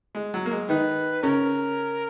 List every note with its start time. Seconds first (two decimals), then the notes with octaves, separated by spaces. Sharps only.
0.15 G#3
0.34 F#3
0.46 A#3
0.51 G#3
0.69 D#3 D#4 B4
1.23 C#3 C#4 A#4